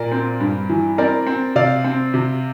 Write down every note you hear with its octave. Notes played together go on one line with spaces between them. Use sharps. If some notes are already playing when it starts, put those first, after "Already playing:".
Already playing: A#2 A#4 D5
C4
G2
E3
C4 A#4 D5
C4
C3 D5 F5
C4
C3